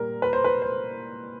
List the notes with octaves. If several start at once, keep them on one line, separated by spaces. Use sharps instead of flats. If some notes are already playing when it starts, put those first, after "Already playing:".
Already playing: A#2 G3 A#4
B4
C5
B4
C5